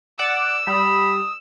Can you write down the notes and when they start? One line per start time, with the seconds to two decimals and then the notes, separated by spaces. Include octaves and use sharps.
0.19 D5 F#5 D6 E6
0.67 G3 B5 D#6